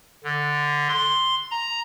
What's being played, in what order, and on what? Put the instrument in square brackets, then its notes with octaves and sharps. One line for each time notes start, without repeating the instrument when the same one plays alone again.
[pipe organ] D3
C6
A#5